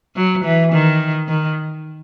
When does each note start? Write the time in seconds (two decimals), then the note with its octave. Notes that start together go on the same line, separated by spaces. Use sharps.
0.16 F#3
0.44 E3
0.72 D#3
1.28 D#3